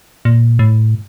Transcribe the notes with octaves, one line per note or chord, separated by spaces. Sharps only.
A#2
A2